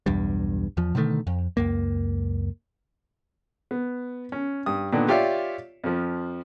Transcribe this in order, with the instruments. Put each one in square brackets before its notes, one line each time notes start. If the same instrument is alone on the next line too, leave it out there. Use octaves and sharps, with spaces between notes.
[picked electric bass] B1 E2 G2 G3
E2 F3
B2 D3 D#3 A3
F2
C#2 F#2 A#3
[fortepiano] B3
C#4
G2 D#6
A#2 D3 D#3 B3 D4
F4 G4 C#5 D5 E5 F5
F2 F3